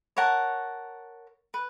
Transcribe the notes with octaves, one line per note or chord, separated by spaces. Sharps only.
A#4 C#5 F#5 A5
B4